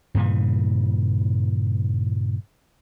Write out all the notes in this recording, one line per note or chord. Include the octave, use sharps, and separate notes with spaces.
G2 A#2 C#3 E3